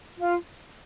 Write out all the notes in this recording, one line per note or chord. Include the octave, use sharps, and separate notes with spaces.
F4